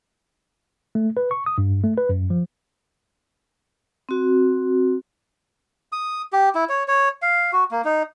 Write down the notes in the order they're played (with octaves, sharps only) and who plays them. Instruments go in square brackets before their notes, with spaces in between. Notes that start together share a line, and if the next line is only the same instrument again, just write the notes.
[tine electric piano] A3
B4
C#6
D#6
G2
A3
B4
F#2
F3
[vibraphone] C4 F#4
[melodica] D#6
G4
E4
C#5
C#5
F5
F#4
A#3
D#4